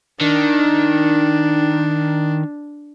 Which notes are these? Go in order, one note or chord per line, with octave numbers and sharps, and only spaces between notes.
D#3 D4